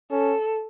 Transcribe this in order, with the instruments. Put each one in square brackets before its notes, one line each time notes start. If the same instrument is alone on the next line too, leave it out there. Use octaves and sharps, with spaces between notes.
[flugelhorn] C#4 [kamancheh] A4